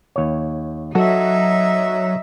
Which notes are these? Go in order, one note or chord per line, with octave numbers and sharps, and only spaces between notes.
D#2 C#5
F#3 D#4 F#4 A4 E5